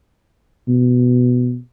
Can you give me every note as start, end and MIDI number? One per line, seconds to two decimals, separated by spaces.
0.68 1.57 47